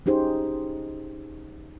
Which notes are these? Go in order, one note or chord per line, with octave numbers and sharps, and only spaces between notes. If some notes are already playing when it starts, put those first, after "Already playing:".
C#4 D#4 G4 G#4 C5